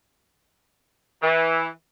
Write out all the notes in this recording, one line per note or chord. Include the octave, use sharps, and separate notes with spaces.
E3